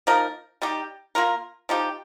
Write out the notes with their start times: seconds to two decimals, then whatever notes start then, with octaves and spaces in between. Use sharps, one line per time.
0.07 F3 A#3 D#4 A#4
0.62 G3 D#4 G4
1.15 A#3 F4 A#4
1.69 F3 D#4 G4